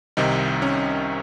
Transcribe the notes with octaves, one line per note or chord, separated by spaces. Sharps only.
C2 C3 D#3 D#4
C#4